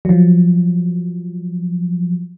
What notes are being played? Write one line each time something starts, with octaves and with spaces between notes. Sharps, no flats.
F3 F#3